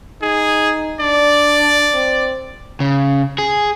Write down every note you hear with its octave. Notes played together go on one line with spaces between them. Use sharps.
D#4 G#4
D4 D5
C4
C#3
G#4